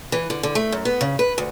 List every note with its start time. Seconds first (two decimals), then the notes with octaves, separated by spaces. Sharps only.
0.12 E3
0.30 D3
0.43 D3
0.55 A3
0.72 F#2
0.85 B3
1.01 C#3
1.19 B4
1.38 D2